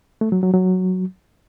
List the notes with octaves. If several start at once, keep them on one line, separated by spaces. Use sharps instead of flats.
A3
F#3
F#3
F#3